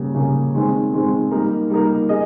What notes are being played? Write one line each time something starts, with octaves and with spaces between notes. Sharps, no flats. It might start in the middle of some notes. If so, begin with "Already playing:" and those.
Already playing: C#3 G3 A#3
C#3 G3 A#3
D#3 G#3 C4
D#3 G#3 C4
G3 A#3 D#4 A#4
G3 A#3 D#4 A#4
G#4 D#5